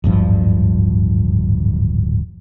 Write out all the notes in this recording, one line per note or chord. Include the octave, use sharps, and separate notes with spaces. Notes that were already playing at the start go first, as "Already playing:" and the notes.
D1 G#1 G2 F3